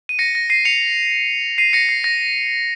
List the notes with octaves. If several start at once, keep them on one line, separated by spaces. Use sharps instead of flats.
D#7
A#6 C#7
A#6
C7 D#7
C#7 F7
C7 D#7
A#6 C#7
C7
A#6